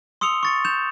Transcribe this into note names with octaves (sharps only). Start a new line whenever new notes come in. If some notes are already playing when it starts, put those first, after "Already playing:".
C6 D#6 E6 C#7 F7 G7
C#6 A6 C#7
G6 E7 F7